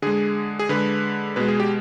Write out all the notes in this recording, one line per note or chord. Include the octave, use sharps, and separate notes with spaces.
D3 G#3 G#4
G#4
D3 G#3 B4
B2 G#3 B4
G#4
G4